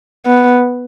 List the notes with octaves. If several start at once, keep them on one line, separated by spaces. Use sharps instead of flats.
B3